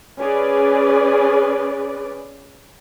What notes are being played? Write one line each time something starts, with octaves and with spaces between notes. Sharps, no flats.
C#4 G#4 B4 D5